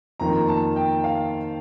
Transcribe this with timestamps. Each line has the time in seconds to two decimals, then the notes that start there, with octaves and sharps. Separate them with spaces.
0.20 F2 D#3 A#3 F4 A#5
0.48 A5
0.76 G5
1.04 F5